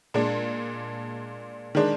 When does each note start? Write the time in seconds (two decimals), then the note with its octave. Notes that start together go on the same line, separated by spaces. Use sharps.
0.14 A#2 G#3 D4
1.75 D#3 G#3 D4